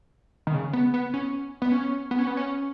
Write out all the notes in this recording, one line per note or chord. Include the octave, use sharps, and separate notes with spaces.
D#3
C#3
B3
B3
C#4
B3
C#4
B3
C#4
B3
C#4